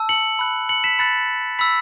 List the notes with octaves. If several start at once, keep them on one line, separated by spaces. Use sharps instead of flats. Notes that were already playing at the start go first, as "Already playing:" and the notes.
Already playing: A5 E6
C#7 F#7
B5 F#6
C#7 F#7
B6 E7
B5 F#6 A6 C#7
B5 E6 B6